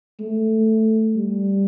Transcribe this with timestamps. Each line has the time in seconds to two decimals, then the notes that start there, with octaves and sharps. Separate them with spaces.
0.20 A3
1.16 G3